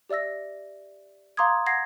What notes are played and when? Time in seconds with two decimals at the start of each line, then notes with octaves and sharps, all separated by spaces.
0.09 G4 D5 E5 E6 A#6
1.37 F5 A#5 C6 D6 D#6 G#6
1.66 F#5 G#6 A#6 C7